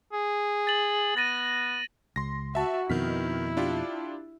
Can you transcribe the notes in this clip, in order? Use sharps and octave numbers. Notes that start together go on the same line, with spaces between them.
G#4
A6 F#7
B3 A6 A#6 D#7
C#2 C6 A#6
F#4 E5 A5
F2 B2 D#3 E4 F6 B6
D4 F4 G4